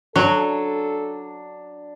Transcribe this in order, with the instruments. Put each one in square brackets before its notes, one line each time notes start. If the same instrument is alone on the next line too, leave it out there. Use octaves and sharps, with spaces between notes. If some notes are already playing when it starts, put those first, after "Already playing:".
[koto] F#3 [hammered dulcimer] D4 [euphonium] A4